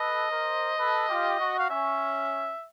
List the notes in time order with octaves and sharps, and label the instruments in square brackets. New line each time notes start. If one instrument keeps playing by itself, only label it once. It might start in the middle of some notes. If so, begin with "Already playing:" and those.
Already playing: [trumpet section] A4 B4 [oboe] D#5
[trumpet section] A#4 C5
A4 B4
F4 G4
F#4
[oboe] F5
[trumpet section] C#4 [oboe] E5